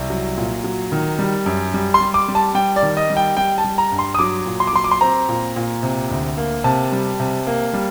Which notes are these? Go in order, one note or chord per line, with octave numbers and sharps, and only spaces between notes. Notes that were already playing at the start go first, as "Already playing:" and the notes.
Already playing: C2
F#3
A#2
F#3
D#3
G3
F#2
G3
C6
G3
D6
G3
A5
G3 G5
D5
D#3
D#5
G3
G5
G3 G5
A5
G3
A#5
G2
C6
D#6
F#3 D6
A#2
C6
D6
F#3 C6
D6
C6
C4 A#5
A#2
A#2
C3
D2
A#3
C3 A5
G3
C3
A#3
G3